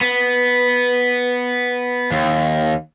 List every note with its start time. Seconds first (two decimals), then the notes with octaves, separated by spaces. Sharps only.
0.01 B3
2.11 D#2